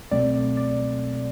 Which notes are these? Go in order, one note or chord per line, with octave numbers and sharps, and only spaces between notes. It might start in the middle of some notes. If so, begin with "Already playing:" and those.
C#2 B2 F#3 A3 C4 D5
D5